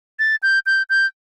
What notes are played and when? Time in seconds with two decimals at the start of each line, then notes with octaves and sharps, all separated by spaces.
0.19 A6
0.43 G6
0.66 G6
0.90 G6